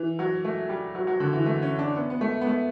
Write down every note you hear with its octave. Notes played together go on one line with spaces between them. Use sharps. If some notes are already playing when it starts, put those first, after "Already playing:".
Already playing: E3
F#3
A3
G3
F#3
F#3
D3
E3
A3
C#4
D4
B3
B3
A3
B3
A3